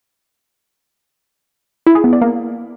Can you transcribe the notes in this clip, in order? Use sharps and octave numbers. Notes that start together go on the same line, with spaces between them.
E4
G#4
B3
D5
A#3